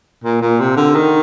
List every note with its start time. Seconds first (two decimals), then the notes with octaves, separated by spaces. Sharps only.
0.24 A#2
0.42 A#2
0.60 C3
0.77 D3
0.95 D#3